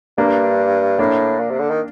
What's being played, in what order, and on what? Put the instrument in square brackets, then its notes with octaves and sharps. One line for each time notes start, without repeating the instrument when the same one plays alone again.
[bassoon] G2 [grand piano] A#3 D4
[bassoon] A2 [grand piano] A#3 D4
[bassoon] A#2
C3
D3
D#3